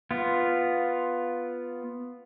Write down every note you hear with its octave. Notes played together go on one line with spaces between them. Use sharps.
B3 F4